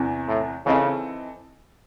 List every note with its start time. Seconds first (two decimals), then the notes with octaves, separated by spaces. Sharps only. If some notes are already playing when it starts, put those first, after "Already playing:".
Already playing: E2 C3 E3
0.28 A2
0.66 C#3 E3 C4 D#4 A4 D#5